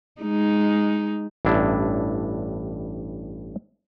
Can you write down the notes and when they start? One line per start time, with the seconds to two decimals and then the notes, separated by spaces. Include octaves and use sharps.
0.21 G#3 D#4
1.45 A1 G2 D4 E4